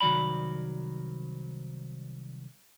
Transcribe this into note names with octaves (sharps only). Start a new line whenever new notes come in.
C2 D#3 F#3 D5 B5